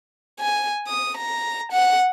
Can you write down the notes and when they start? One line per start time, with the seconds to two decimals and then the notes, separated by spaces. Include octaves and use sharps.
0.40 G#5
0.87 D#6
1.17 A#5
1.72 F#5